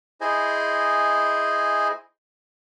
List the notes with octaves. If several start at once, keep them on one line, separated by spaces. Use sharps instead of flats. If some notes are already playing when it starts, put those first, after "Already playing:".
E4 G#4 C5 D#5 G#5